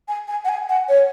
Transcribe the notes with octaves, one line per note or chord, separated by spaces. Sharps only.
G#5
G#5
F#5
G#5
F#5
C#5